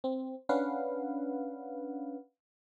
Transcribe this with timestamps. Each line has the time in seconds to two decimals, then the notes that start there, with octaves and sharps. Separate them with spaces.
0.04 C4
0.49 C#4 D4 B4 F5 F#5